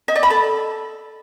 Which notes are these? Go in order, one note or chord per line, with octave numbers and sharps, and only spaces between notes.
D#5
D5
B5
A4